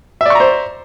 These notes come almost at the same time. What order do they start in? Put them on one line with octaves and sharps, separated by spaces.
E5 D5 C#6 A#5 C5